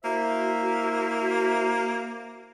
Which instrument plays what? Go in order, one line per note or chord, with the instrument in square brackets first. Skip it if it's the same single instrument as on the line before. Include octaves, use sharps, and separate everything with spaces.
[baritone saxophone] A#3 [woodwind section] E4 C5 E5 [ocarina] F#4